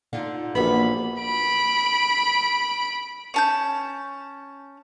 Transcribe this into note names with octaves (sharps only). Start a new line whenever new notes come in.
D3 D#4 F4
A#1 E3 A#3 B3 F#4 B4 B5
B5 D7
C#4 A5 G6